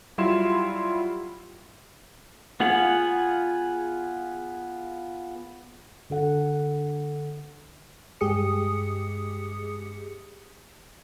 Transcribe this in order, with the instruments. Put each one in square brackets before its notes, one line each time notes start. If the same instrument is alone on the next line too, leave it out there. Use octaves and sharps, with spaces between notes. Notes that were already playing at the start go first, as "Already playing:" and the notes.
[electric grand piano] F#3 G3 E4 F4 C6 E7
[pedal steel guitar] B3 F4 G#4 F#5
[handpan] D3 A4 F#5
[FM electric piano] G2 G#3 G4 G#4 D#6 C#7